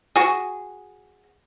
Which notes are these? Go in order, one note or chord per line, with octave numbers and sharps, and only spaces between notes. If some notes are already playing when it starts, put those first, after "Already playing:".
F#4 G#4